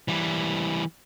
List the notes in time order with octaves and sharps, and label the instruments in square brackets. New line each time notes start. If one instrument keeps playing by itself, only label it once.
[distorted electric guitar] E3 G3